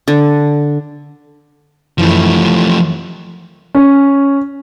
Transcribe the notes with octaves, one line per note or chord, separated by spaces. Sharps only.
D3
F#2 E3 F3 A3
C#4